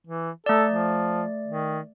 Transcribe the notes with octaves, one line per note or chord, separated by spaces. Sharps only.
E3
A3 A4 D5
F3
D#3